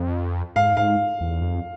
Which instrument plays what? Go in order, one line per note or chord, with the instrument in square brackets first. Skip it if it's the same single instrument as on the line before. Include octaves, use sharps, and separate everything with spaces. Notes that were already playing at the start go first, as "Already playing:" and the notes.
Already playing: [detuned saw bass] F2
[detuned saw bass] G#2 [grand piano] F5
[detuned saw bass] G#2 [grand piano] F5
[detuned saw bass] E2
F2